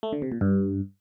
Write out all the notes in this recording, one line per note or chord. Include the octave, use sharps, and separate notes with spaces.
A3
D3
C3
A#2
G2